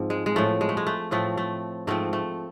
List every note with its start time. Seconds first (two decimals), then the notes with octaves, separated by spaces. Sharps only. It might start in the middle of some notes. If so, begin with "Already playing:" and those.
Already playing: G#2 F3 C4
0.10 G#3
0.26 G#3
0.36 A2 F3 A3
0.61 G#3
0.69 A3
0.77 G#3
0.87 A3
1.11 A2 F3 A3 C4
1.37 A3
1.87 G#2 F3 A3 C4
2.13 A3